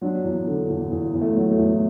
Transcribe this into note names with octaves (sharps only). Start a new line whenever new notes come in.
F#3 D4
E2
D3
E2
E2
E2
A3
F#3
A3
E2